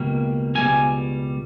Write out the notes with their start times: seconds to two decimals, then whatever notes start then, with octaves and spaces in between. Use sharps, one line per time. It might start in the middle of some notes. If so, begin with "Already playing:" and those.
Already playing: C#2 B2 G3 A#3
0.55 C#2 B2 G3 A#3 G#5